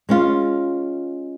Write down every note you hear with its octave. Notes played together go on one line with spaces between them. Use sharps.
G#3 C#4 F4